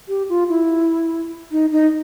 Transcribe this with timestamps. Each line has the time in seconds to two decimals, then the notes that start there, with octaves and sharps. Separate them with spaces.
0.08 G4
0.29 F4
0.49 E4
1.52 D#4
1.72 D#4